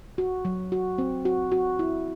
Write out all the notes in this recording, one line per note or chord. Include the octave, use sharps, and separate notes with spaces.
F#4
F#3
F#4
C4
F#4
F#4
E4